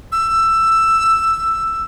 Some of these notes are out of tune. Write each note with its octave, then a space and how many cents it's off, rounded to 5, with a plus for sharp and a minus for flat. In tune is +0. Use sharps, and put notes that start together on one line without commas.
E6 +10